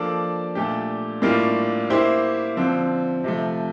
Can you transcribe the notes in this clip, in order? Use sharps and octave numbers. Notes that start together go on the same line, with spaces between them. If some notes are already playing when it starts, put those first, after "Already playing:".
Already playing: F3 A#3 D4 A4 D5
A#2 A3 D4 G4
A2 G3 A#3 D4 F4
A#3 E4 G4 C5
D3 F3 C4
C3 F3 A3